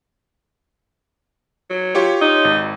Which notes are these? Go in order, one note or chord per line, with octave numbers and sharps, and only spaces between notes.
F#3
F4 G4 C#5
D#4
G#1